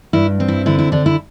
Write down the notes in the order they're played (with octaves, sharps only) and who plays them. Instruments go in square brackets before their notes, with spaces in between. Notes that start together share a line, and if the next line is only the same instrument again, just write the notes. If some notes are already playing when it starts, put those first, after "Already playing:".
[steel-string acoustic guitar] G2 E4
C4
E4
D3 E4
E4
D3 D4
E4